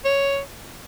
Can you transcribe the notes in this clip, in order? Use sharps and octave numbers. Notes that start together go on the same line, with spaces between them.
C#5